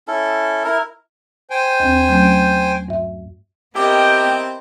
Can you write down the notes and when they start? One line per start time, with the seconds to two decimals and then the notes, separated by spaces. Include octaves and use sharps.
0.08 C#4 E4 A4
0.64 E4 A#4
1.50 C5 G5 G#5
1.80 D#2 C4
2.09 F#3 A3 C#4
2.88 G2 E5
3.76 B3 C4 E4 G4 A#4 D#5 G5 D6